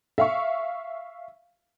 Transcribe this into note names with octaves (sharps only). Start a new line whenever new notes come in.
E5 F5 C#6